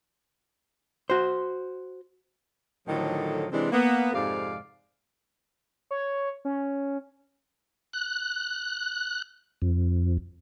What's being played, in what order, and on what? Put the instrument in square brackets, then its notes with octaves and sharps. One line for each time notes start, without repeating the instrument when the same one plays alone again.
[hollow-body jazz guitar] F#4 C5
[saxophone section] A2 D3 D#3 F3 F#3 A4
C3 E3 G#3 C4 D4
A#3 B3
F2 G#2 C3 D5 F5
[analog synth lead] C#5
C#4
[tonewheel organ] F#6
F2